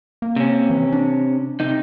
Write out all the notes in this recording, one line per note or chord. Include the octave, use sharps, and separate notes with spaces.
A#3
C3 C#4
E3
D4
C3 D#4